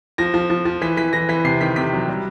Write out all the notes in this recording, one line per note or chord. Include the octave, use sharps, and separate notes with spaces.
F3 A#6
F3
F3
F3
E3 B6
E3 B6
E3 A#6
E3 B6
C3 C7
D#3 B6
C3 B6
F#3
G3